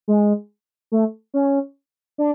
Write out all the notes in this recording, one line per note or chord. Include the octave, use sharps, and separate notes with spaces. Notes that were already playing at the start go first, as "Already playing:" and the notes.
G#3
A3
C#4
D4